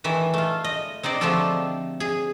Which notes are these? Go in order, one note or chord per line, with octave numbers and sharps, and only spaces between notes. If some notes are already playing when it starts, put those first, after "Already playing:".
D#3 E3 A3 E5
A3 F4
D#5
C4 D#4 C5 D5
D3 F3 A3 C4 G4 A4
G#4